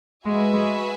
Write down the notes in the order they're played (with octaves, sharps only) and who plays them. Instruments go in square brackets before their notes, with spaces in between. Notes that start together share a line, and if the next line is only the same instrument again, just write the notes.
[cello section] G#3 [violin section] F#4 B4 E5 G#5
[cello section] G#3